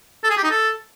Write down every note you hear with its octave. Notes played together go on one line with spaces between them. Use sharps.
A4
G#4
G4
D#4
A4